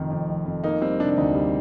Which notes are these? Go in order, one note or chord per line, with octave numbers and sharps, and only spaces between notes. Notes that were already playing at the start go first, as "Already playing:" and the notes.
Already playing: F1 F2 D#3
F2
F1
F2
A#3 D#4
G3 C4
C3 D4
D4
D2 D#4
G3